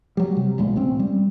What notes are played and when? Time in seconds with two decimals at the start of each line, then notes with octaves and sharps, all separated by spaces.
0.17 F#3 G3
0.37 C3
0.58 E1 C#2 A#2 G#3
0.76 A1 C4 C#4
0.99 G3